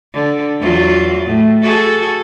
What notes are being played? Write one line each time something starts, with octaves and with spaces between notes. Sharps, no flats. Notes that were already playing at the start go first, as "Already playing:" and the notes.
D3
E2 F#3 F4
A2
F#4 G#4 A4